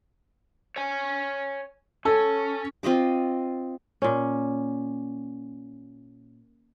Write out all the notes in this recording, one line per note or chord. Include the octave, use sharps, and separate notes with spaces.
C#5 G#5
C#4 A4
C4 F4 D#5 D6
A#2 C#4